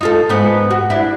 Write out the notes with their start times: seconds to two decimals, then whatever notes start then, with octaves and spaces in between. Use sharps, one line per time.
0.01 D#4 F4 A4
0.29 G#2 B3 D#4
0.71 F#4
0.90 D4 E4